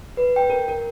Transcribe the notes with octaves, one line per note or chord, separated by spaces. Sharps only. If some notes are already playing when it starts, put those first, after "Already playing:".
B4
G5
A#4
A#4